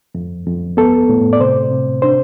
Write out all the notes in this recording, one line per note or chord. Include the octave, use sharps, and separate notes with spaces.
F2
F2
B3 A4
A2
D5
C3 C5
C3
D4 C5